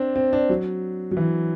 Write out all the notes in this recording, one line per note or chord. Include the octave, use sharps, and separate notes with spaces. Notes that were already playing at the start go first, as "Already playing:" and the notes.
Already playing: C4 D4
C4
D4
F#3
F#3
E3